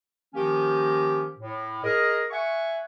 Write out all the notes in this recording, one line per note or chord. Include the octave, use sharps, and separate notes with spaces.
D#3 F3 A#3 C#4 G4
A2
G#4 A#4 D#5
E5 F#5 G#5 C#6